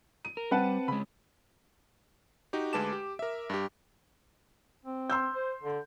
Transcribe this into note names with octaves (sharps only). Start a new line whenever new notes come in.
D#7
A#4
G3 C4 B4 F#5 A5
C#3 G#3 B5
D#4 F#4 G4
D2 G#3 B4 A5 D6 E7
G4
A#4 E5
G2 G4
C4
C6 E6 G6
C5
D3